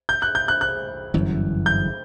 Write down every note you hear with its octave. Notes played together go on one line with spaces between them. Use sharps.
G6
F#6
G6
F#6
F#6
G1 F#2 E3
G6